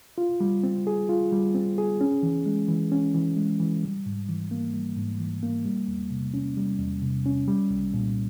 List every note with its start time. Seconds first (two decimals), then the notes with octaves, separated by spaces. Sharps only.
0.18 F4
0.40 G3
0.64 C4
0.87 G#4
1.09 F4
1.32 G3
1.55 C4
1.78 G#4
2.01 C#4
2.23 E3
2.46 G#3
2.68 E3
2.92 C#4
3.14 E3
3.37 G#3
3.60 E3
3.83 G3
4.06 G#2
4.29 E3
4.51 A#3
4.74 G3
4.97 G#2
5.19 E3
5.43 A#3
5.65 G3
5.88 E2
6.11 C3
6.34 C#4
6.57 G3
6.79 E2
7.02 C3
7.26 C#4
7.48 G3
7.70 C2
7.94 A#2